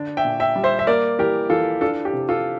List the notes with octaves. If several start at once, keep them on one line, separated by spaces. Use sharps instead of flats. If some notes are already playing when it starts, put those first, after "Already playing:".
Already playing: D3 D4
E5 G5
A#2
E5 G5
G3
C5 E5
E5
A#3 A#4 D5
E3 G4 A#4
E3 F4 A4
D4 F4 A4
G4
C3
F4 A4